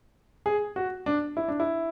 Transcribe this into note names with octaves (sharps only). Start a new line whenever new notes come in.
G#4
F#4
D4
E4
D4
E4